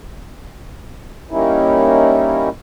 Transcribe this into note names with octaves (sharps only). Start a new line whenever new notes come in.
G3 A#3 C#4 D#4 E4